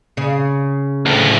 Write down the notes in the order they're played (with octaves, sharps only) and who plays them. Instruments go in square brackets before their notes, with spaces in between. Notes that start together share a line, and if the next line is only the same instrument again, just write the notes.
[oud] C#3
[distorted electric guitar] D2 A2